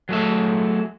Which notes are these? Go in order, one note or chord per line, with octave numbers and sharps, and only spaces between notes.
F#3 G#3 A3 E5